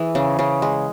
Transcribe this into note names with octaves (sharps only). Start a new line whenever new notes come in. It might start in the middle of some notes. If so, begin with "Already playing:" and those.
Already playing: E3 G#4
C#3
C#3
G#3